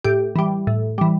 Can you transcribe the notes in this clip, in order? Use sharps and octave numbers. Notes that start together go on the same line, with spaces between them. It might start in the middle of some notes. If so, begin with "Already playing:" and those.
A2 G4
E3 G3
A2
E3 G3